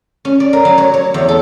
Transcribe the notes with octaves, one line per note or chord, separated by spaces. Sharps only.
C#4
D5
A#4
F#3
C#5
C#5
E2
A4